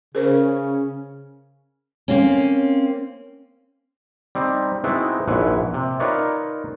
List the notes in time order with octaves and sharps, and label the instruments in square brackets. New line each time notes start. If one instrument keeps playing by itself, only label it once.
[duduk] C#3 [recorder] C#4 [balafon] G#4 A#4 C5
[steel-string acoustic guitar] A#3 C4 C#4
[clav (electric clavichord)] G3 C4 D#4
G#3 B3 C4 D#4 E4 F#4
A#1 G#2 E4 B4 C#5 G#5
C3
D#4 F4 A#4 B4 C#5 D5